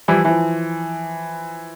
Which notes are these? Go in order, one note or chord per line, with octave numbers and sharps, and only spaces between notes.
E3 F3 G3 E4
E3 F3